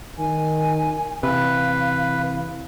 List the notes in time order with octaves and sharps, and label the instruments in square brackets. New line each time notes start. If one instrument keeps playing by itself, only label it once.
[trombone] D#3 [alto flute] G#5
[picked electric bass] C3 [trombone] E3 [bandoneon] B4 [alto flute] F5